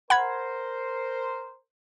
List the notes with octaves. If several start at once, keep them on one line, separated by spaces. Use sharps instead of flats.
A#4 C5 F#5 B5 G#6